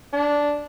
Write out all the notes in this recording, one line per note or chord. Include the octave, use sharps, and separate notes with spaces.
D4